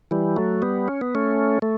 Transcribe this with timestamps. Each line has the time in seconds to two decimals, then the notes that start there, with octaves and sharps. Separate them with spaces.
0.11 E3 G3
0.36 F#3 A3
0.62 G3 B3
0.88 C#4
1.01 B3
1.15 A3 C#4
1.62 A3